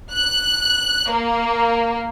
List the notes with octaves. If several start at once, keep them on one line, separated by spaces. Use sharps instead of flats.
F#6
A#3